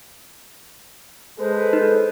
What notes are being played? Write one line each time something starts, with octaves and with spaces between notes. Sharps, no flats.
G#3 A4 B4 C5
D#4